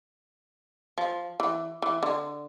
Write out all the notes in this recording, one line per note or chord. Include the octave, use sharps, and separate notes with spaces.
F3
E3
E3
D3